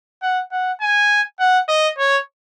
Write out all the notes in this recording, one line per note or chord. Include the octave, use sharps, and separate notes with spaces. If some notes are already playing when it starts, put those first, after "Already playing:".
F#5
F#5
G#5
F#5
D#5
C#5